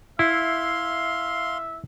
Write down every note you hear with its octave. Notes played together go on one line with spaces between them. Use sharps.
E4 E5 F5 C6